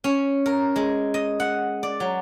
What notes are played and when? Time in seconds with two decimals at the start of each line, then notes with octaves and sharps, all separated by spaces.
0.04 C#4
0.46 A#4
0.76 G#3
1.14 D#5
1.40 F#5
1.83 D5
2.00 F#3